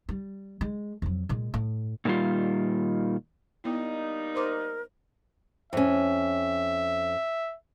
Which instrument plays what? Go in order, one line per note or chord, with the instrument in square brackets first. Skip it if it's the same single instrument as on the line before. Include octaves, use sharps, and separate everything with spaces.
[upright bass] G3
G#3
F2 F#3
A#2 G#3
A2
[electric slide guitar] A#2 D#3 E3 G3 F4
[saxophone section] G3 A#3 D#4 [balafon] B3 E4
[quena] A#4 [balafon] C5 C6 D6
[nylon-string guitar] F2 C#4 [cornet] E5